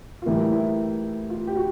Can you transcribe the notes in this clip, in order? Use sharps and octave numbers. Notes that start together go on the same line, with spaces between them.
F4
A2 E3 G3 A#3 E4
E4
F4
G4
F#4